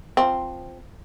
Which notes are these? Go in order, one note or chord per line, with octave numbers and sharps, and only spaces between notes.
F3 C4